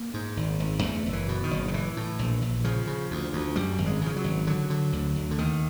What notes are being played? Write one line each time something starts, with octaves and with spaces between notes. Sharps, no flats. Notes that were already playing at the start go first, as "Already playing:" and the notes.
Already playing: A#3
G#2
G#1
G#1
E2 A3
F#1
E3
B2
D#3
F#1
D#3
A2 E3
A2
A#1
A#1
C#3 F3
C#3
D2
D2
F#2 G3
G#1
G#3
C#3 F3
F#3
G#1
D3 F#3
D3
D2
D2
D3
D#2 D#3